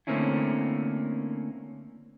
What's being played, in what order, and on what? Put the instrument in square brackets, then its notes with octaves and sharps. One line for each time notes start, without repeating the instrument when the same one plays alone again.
[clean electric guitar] D3 A3 A#3 C4 C#4 E4